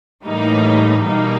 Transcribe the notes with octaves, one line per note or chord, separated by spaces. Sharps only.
A2 E3 G3 A#3 D#4
B2 G3 A#3 D#4